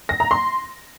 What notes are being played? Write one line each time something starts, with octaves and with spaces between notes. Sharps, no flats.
A#6
A#5
C6